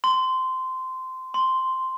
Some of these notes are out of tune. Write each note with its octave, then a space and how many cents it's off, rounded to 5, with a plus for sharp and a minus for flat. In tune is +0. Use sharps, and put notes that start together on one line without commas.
C6 -15
C6 -5